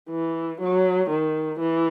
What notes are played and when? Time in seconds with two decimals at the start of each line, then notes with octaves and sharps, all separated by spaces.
0.10 E3
0.61 F#3
1.10 D#3
1.60 E3